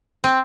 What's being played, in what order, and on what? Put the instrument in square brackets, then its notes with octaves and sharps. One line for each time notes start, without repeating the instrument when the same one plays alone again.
[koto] C4